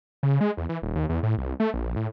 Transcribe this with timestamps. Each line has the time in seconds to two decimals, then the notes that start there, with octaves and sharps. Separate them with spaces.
0.23 C#3
0.41 G#3
0.57 E2
0.69 E3
0.82 D#1
0.96 D#2
1.09 E2
1.23 A2
1.38 C2
1.60 A3
1.74 A#1
1.96 A2